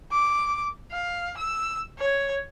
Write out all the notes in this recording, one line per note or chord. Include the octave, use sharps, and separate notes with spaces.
D6
F5
E6
C#5